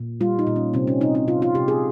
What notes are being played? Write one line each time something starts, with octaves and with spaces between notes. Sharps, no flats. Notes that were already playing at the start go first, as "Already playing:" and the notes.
Already playing: A#2
G3 F4
D#4
A#2
C#4
C3 C4
C#4
C3 D#4
D#4
C3 F4
F4
C3 G4
G#4